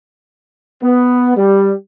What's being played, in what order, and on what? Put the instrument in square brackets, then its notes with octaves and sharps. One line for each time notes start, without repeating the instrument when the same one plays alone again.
[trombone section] B3
G3